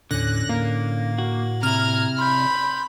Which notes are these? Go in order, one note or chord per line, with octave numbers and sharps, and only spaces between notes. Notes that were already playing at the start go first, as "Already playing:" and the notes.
D#2 A2 D3 C#4 F#6 A#6
A2 A#3
F#4
C3 E4 A#5 F6 G#6
B5 C6 G6